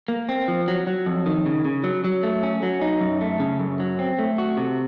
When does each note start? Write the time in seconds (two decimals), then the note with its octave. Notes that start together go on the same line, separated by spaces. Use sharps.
0.08 A#3
0.29 C4
0.48 F3
0.68 F#3
0.87 F#3
1.06 F2
1.26 D#3
1.46 C#3
1.65 C#3
1.84 F#3
2.04 F#3
2.23 A3
2.43 C#4
2.63 F#3
2.82 D#4
3.01 F#2
3.21 A3
3.40 C#3
3.59 F#2
3.80 F#3
3.99 C4
4.19 A3
4.38 F#4
4.57 C3